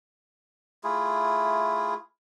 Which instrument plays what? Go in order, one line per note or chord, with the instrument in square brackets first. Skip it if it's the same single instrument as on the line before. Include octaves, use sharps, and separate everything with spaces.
[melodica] A3 E4 F4 G#4